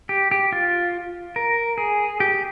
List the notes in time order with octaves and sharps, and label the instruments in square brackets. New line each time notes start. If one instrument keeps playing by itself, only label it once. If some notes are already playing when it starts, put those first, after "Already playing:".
[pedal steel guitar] G4
G4
F4
A#4
G#4
G4